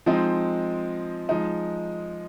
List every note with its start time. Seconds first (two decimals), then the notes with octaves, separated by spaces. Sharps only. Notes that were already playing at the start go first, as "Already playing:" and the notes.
0.06 F3 G#3 C4 D#4
1.29 F3 G#3 D#4